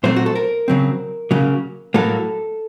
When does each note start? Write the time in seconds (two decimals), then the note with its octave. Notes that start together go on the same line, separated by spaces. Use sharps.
0.04 A#2 F#3 A3 C4 C5
0.16 F#4
0.26 A4
0.35 A#4
0.68 C#3 F#3 C4
1.31 C#3 F#3 A#3
1.94 A2 F#3 A#3 A4